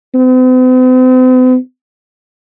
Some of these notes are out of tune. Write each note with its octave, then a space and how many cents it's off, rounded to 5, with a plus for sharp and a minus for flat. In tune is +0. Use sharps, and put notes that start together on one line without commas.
C4 -45